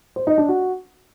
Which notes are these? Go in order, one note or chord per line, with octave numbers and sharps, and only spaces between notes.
C5
D#4
D4
F#4